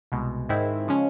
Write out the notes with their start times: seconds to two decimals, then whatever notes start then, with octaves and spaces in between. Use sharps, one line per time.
0.12 C2 B2 G#3
0.49 G#2 D#3 G#3 C4 E4
0.88 C#3 F3 G#3 C#4